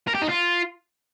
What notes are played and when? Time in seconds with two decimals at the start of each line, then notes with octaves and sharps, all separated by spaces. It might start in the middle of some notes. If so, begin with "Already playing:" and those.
0.08 A#4
0.15 G4
0.22 D#4
0.29 F4